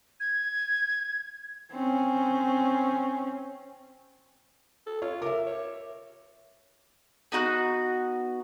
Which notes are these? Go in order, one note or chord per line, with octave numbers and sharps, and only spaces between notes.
G#6
C4 C#4
A4
F4 C#5
A#4 E5 D6
C#5
B3 D#4 F#4 F#6